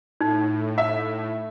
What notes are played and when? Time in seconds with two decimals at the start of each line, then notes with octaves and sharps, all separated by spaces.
0.21 A2 D#4
0.78 E5